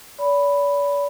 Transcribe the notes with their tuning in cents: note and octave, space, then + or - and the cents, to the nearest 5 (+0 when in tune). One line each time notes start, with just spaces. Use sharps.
D5 -45 B5 +0